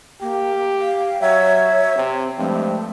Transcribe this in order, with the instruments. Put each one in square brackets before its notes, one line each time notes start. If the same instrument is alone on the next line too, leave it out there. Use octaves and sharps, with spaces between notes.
[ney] A#3 [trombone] G4
[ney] F5
[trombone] F#3 [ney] C#5 [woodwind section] E5
[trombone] C3 [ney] C4
[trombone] G2 [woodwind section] F3 G#3 C4 [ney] A3